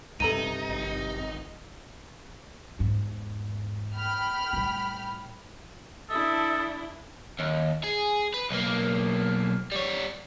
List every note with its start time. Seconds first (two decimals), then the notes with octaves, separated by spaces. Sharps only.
0.20 C#2 G2 C3 D#4 A4 A#5 D#7
0.69 G#1
2.79 E2 G#2
3.96 G5 B5 F6
4.53 A2 G3
6.10 D4 E4 A4 D#6
7.40 D#2
7.84 G#4
8.34 B4
8.50 B1 A#3
9.72 G3 C#5